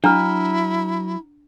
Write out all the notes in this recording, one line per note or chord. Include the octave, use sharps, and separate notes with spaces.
F#3 D4 E4 F#5 A#5 F6